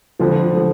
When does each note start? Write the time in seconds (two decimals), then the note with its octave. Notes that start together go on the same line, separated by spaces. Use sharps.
0.19 F2 D3 F3
0.53 D3 F3